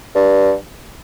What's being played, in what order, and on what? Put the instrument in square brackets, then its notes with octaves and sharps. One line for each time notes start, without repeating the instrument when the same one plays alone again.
[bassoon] G2